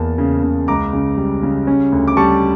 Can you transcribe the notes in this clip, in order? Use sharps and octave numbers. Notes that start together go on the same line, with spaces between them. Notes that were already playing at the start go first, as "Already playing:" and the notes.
Already playing: E2 A#3 A5
C#3
C#3
C#2 A#5 D6
C#3
G3
C#3
C#4
D2
D6
G3 A5 C#6